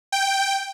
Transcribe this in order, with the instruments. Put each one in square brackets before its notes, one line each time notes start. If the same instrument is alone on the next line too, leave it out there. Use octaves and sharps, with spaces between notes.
[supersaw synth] G5